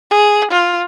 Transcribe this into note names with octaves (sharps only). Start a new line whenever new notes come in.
G#4
F4